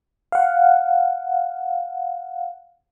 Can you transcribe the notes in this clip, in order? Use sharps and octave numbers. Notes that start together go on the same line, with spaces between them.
F5 F#5